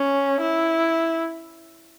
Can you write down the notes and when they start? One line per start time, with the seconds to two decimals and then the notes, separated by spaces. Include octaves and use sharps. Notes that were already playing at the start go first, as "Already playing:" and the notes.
Already playing: C#4
0.41 E4